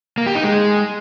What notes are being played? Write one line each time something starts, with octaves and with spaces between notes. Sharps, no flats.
A#3
G4
D#4
G#3